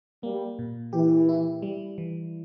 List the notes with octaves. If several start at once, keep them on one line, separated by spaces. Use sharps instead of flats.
G3 A#3
A#2
E3 G4
E4
G3
E3